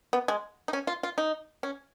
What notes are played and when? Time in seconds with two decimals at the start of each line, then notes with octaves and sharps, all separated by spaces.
0.13 B3
0.28 G#3
0.68 D#4
0.73 C#4
0.87 F4
1.03 F4
1.18 D#4
1.63 C#4